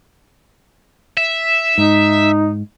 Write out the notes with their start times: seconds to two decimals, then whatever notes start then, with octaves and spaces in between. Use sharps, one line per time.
1.17 E5
1.78 G#2 D#4